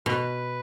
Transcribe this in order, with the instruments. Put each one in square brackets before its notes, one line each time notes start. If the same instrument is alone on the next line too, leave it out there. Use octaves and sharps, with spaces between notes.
[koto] B2 [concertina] B4